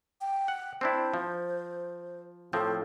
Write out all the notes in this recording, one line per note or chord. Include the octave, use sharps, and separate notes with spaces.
G5
F#5
C4 D4 E4 C5
F3
A2 F3 C4 A4